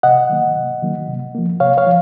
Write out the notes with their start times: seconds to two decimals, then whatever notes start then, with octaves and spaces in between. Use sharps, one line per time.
0.03 C3 D#5 F#5
0.30 D#3 F#3 A#3
0.56 C3
0.82 D#3 F#3 A#3
1.08 C3
1.35 F3 A#3
1.60 C3 C#5 F5
1.78 C#5 F5
1.86 F3